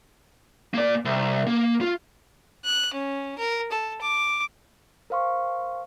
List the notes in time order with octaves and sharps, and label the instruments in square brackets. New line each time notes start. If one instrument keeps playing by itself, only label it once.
[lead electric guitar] A#3 D5
C2
A#3
F4
[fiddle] F#6
C#4
A#4
A4
D6
[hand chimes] A#4 C5 F5 C6 C#6